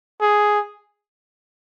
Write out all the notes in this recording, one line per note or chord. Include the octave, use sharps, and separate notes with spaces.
G#4